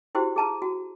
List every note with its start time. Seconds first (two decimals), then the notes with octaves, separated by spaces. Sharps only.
0.15 E4 F#4 G4 C5
0.36 G#4 A5 A#5
0.62 F#4